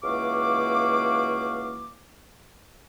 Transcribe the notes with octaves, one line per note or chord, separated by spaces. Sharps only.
C#2 E3 A#3 F#4 F5 D6